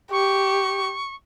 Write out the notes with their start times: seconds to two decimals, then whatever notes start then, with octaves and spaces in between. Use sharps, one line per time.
0.11 G4 C#6